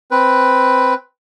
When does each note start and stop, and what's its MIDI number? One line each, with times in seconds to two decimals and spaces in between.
0.11 0.94 60
0.11 0.94 71